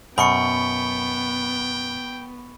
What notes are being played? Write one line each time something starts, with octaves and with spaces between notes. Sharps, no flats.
F#2 B2 B3 G5 B5 C#6 C#7